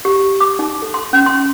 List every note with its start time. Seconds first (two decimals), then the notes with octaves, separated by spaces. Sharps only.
0.05 G4
0.41 D6
0.59 D#4
0.82 A4
0.94 C6
1.13 C#4
1.26 C6